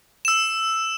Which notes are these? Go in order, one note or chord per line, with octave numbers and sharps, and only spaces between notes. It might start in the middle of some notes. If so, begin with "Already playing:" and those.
E6 E7